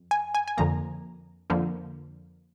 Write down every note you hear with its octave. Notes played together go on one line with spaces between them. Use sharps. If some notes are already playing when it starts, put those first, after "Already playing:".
Already playing: F2
G#5
G#5
G#5
F2 D3 F3 A#3 A#5
F2 D3 F3 A#3